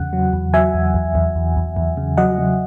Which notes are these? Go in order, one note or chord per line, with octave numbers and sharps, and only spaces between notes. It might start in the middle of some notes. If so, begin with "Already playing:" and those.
Already playing: E2 C#3 F#5
F#3
E2
F#3 E5 G#5
E2
E2
E2
E2
E2
E2
C#3
F#3 D#5 F#5
F#3